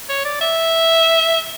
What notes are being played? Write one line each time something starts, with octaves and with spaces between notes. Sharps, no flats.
C#5
D5
E5